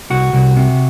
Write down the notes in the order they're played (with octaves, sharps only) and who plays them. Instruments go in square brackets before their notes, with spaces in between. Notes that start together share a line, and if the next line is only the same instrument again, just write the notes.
[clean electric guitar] C2 F#4
C2
C3